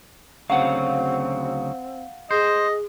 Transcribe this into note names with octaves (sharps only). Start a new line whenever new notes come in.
D2 C#3 F#3 C4 F5 F#5
G#4 C5 D#5